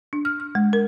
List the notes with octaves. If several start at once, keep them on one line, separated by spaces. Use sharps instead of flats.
D4
F6
F6
G#3
A#4